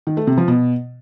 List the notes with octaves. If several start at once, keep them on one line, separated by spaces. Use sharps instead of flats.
D#3
A3
C3
F3
B2